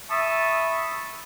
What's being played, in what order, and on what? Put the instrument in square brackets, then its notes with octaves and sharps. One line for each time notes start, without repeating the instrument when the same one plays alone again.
[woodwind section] E5 A5 B5 C#6 D#6 E6